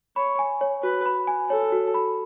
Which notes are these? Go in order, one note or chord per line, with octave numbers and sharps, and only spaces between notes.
C#5 B5
G#5
C#5
F#4 B4
B5
G#5
A4 C#5
F#4
B5